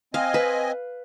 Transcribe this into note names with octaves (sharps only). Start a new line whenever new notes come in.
C4 D#5 F5 G#5
B4